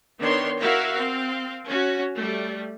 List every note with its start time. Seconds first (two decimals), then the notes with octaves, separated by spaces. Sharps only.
0.19 D#3 B3 D4 C#5 C6
0.60 E4 F#4 A#4 E5 F5
0.95 C4 F5
1.67 C#4 F#4
2.14 G3 A3